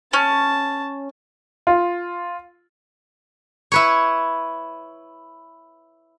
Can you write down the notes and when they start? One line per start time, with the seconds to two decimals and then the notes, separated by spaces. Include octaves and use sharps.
0.13 C#4 A5
1.67 F4
3.72 E4 B4 C#5